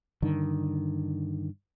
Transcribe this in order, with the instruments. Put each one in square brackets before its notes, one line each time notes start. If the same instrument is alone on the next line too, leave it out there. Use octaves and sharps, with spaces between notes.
[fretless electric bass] G2 D3 D#3